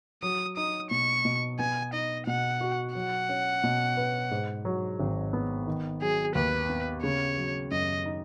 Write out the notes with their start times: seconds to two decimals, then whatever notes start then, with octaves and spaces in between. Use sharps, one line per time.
0.23 F#3 D#6
0.57 D#4 D#6
0.91 B2 C#6
1.25 B2
1.59 B3 G#5
1.93 D#4 D#5
2.27 B2 F#5
2.61 F#4
2.95 F#3 F#5
3.29 C#4
3.64 B2
3.97 B4
4.31 G#2
4.65 F#3
5.00 G#1
5.33 B3
5.67 D#3
6.01 F#3 G#4
6.35 D#2 B4
6.70 B3
7.03 C#3 C#5
7.37 F#3
7.71 F#2 D#5
8.05 D#4